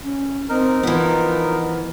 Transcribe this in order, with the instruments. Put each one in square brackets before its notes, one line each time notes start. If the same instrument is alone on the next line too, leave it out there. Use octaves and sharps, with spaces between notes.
[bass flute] C#4
[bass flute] C4 [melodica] D#4 A#4
[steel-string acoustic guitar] E3 B3 [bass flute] F3